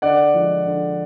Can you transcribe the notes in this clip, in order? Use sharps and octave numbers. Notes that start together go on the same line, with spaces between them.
D3 D5 F#5
F3 G#3
D3